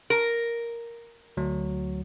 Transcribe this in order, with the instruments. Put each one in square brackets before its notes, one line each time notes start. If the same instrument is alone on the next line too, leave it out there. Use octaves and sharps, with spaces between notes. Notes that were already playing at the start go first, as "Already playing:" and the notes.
[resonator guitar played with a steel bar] A#4
[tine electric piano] D2 F#3